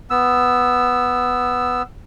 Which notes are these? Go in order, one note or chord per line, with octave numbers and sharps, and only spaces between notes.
B3 E6